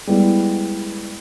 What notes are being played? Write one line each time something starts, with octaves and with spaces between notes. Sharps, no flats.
G3 G#3 B3 E4